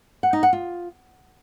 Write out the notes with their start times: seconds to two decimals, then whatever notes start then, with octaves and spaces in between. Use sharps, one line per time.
0.23 F#5
0.33 D#4
0.43 F#5
0.53 F4